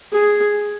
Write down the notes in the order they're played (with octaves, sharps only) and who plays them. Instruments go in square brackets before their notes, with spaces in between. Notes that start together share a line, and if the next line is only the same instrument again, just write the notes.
[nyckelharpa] G#4